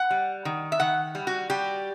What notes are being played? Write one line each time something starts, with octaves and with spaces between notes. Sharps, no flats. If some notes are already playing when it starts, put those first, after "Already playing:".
Already playing: F#5
G3
D#3
E5
D#3 F#5
G3
F#4
G3 G4